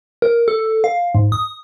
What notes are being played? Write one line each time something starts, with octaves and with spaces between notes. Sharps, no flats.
A#4
A4
F5
G#2
D#6